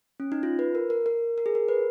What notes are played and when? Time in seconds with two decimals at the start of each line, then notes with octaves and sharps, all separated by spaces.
0.20 C#4
0.32 D#4
0.43 F4
0.59 B4
0.75 A#4
0.90 A#4
1.06 A#4
1.38 A#4
1.46 G#4
1.55 A#4
1.69 B4